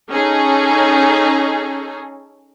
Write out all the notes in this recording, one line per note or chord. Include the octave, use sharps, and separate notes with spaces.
C#4 D#4 G#4 A4